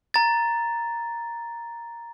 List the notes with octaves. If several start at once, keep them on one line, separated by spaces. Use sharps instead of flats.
A#5 A6